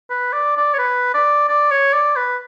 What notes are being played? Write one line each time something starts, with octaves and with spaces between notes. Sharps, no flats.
B4
D5
D5
C#5
B4
D5
D5
C#5
D5
B4